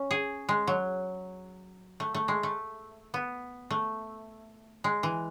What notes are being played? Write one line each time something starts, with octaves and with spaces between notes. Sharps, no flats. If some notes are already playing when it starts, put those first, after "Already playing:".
Already playing: C#4
G#4
G#3
F#3
A3
A3
G#3
A3
B3
A3
G#3
E3